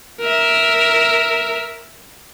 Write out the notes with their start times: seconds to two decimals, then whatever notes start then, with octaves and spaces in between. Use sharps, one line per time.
0.21 A#4 E5